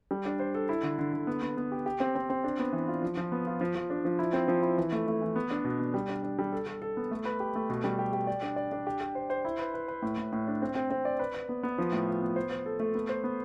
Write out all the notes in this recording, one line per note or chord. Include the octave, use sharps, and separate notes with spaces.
G3
D4
C5
A4
E4
D3
D3
D3
B3
B3
B3
G4
G4
C4
C4
C4
D4
B3
E3
F4
F3
F3
B3
F4
F3
F3
D4
F3
E4
C4
F3
E4
E3
A3
A3
E3
B3
D4
B2
B3
G3
D4
D4
G3
A4
A4
A4
B3
A3
B4
G4
A3
B2
G3
G4
G4
D5
D4
D5
D4
G4
G4
C5
C5
E4
B4
B4
B4
A2
A2
A2
D4
C4
C4
C4
D5
B4
B4
B3
B3
F3
A2
F4
B3
C5
C5
A4
A3
B3
C5
B3